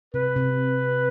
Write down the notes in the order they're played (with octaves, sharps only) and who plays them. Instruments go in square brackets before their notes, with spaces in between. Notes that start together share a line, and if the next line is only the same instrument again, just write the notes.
[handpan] C3 [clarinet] B4
[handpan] C3